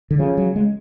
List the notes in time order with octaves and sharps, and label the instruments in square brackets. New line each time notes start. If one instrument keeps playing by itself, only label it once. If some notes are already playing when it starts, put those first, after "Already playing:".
[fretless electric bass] D3
[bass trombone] C#3 [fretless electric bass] F3
[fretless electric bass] F#3
G#3